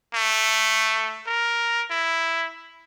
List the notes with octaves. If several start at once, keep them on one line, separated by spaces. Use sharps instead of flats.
A3
A#4
E4